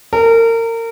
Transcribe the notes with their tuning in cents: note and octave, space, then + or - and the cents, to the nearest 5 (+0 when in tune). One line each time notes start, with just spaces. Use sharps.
A#4 -30